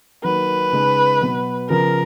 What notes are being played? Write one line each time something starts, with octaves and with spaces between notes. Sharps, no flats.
D#3 F#3 A#3 B4
C#3 G#3 D#4
B2 F#3 B3
C#3 F3 B3 A#4